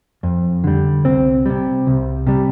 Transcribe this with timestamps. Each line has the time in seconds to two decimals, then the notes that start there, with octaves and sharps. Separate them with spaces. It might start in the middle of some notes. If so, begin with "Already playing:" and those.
0.23 F2
0.64 D3 G3
1.05 C2 C4
1.46 C3 G3
1.87 C2
2.27 C3 G3